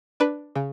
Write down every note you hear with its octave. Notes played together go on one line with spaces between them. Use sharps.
D4 B4
C#3